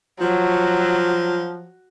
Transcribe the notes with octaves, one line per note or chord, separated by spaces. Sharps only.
F3 F#3